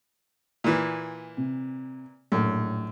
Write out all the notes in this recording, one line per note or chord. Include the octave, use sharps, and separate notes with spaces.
A#2 E3
C3
A#1 F#2 A2